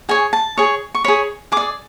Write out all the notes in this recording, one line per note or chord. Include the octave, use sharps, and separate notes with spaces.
G#4 C#5 G#5
A5
G#4 C#5
C#6
G#4 C#5 B5
G#4 D6
D5